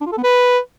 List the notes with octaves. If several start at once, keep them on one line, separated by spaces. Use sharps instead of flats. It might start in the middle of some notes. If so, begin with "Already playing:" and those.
D4
F4
A4
B3
B4